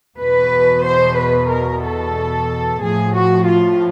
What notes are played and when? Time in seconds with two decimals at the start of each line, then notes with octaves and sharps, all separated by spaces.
0.18 E2 B2 B4
0.84 C5
1.17 B4
1.49 A#4
1.83 A4
2.81 A2 F3 G#4
3.14 F#4
3.47 F4